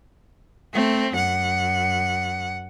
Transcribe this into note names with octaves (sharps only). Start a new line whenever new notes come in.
A3 C4
F#2 F#5